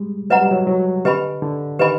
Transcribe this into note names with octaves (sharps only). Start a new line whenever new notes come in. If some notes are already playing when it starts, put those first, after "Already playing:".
Already playing: G3 G#3
F#3 B4 D#5 F#5 A#5
G3
F#3
F#3
D3 G4 B4 D#5 G#5 B5
D3
D#3 G4 B4 D#5 G#5 B5